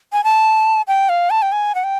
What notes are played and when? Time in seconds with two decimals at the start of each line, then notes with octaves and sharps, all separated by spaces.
0.13 G#5
0.24 A5
0.88 G5
1.09 F5
1.30 A5
1.42 G5
1.52 G#5
1.75 F#5
1.84 G5